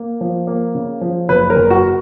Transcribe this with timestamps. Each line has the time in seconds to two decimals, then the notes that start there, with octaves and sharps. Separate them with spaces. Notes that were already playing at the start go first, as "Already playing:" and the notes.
Already playing: A#3
0.21 F3
0.47 A#3
0.75 C#3
1.01 F3
1.29 F#1 B4
1.50 A#4
1.56 F#1
1.70 F#4